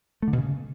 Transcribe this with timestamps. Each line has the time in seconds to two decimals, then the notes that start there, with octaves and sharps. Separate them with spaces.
0.22 A3
0.28 D3
0.33 B2
0.38 C#3